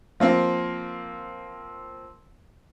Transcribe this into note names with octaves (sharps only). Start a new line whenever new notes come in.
F3 A#3 C4